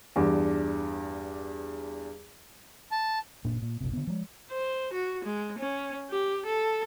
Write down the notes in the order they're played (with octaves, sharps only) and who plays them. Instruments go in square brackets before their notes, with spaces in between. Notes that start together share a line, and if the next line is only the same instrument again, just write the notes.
[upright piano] E2 G2 D4
[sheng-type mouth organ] A5
[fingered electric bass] F#1 A#2 A#3 D4
A#2
F#1 B1 C3
D3 B3
F3 G#3
[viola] C5
F#4
G#3
C#4
G4
A4